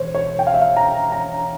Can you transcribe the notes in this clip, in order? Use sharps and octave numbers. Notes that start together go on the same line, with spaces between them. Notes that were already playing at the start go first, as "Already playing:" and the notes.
Already playing: E1 C5 C#5
C#5
G5
F5
E5
F5
A#5
A#5